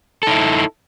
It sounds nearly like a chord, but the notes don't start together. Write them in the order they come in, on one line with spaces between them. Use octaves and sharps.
A4 D#4 E4